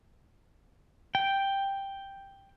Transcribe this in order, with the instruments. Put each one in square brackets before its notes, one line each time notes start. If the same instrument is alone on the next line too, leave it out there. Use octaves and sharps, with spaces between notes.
[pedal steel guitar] G5